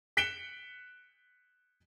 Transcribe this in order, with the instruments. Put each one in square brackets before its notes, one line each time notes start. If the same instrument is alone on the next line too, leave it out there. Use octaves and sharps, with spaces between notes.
[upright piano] F#6 B6 C#7 D7 E7 G7